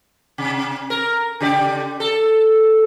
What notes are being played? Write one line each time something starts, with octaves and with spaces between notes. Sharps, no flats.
C3
A#4
C#3 G4 D5
A4